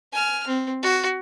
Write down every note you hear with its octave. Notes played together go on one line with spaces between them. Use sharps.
G#5 F6
C4
F#4